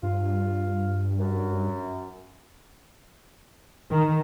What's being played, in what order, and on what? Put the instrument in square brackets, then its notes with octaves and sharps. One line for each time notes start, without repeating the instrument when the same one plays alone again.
[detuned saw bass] G2 [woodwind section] F4
[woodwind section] F#2
[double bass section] D#3